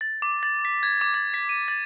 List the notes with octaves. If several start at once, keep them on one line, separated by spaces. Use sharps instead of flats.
A6
D6
A6
B6
G#6
D6
A6
B6
D#7
A6